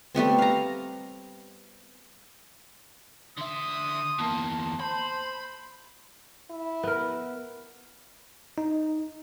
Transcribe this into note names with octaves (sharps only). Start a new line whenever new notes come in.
G3 A3 B3 C4
F5 A#5
D3 E5 C6 D#6
E2 A#3 A5
C5 B5
E4
B3 A#4
D#4